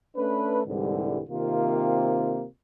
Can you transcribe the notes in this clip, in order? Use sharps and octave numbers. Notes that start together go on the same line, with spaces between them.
A3 C#4 D4 B4
C2 G#2 D3 E3 G3
C3 D#3 A#3 C4 F4